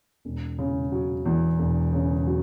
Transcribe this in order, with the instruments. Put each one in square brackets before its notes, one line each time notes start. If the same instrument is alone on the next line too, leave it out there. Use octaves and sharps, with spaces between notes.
[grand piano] E1
C#3
F#3
E2
E1
C#3
F#3